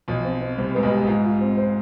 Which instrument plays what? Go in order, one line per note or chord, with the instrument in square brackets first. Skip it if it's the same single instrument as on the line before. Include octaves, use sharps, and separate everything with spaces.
[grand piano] B1 B2 [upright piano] F3
[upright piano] C4
C4
[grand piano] C2 C3 [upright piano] C4
[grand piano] G#2 [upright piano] B4
[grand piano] B1 B2
[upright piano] G4
[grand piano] G#2 [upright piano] F4
[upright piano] F4
C4
C5